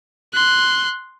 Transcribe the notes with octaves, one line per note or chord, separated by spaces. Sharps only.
C6 F#6